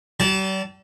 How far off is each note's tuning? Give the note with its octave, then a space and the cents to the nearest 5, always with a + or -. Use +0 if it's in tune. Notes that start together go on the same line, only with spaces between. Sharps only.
G3 -40 A5 +0